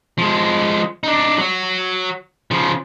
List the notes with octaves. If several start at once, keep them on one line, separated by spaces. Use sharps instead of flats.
F3 G#3
D4 D#4
F#3 F#4
C#3 F3